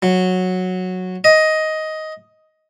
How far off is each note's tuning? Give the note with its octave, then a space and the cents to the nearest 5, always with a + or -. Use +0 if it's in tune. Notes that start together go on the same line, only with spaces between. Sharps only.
F#3 -10
D#5 +10